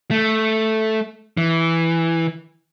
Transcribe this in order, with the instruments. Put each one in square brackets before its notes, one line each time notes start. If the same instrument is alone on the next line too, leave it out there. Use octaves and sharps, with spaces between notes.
[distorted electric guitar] A3
E3